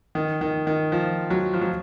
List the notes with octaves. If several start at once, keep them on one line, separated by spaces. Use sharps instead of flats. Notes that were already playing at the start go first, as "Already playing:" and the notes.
D#3
D#3
D#3
F3
F#3
F3
F#3